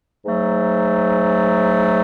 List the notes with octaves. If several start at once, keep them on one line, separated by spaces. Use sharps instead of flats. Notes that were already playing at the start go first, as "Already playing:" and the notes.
G#2 F#3 A3